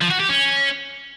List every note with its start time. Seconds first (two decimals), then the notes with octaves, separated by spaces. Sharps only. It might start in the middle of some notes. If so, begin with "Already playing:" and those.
0.02 F3
0.11 F#4
0.20 G4
0.29 C#4